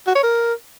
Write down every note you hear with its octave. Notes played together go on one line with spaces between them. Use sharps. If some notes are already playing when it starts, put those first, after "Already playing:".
F#4
C#5
A#4